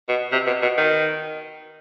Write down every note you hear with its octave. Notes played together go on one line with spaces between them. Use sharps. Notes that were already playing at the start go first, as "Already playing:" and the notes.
B2
C3
B2
B2
D#3